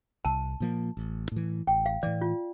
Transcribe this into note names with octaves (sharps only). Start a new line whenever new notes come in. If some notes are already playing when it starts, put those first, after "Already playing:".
C2 A5
A#2 F3 A#3
A1
A2 E3
A1 G5
F5
A2 E3 D5
F4